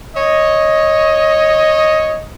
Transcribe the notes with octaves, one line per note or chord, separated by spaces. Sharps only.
C#5 D#5